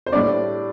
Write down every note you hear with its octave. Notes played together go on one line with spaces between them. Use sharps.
C5
A2 G3 D4 D5